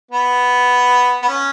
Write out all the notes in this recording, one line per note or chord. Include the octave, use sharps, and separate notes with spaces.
B3
B3
C#4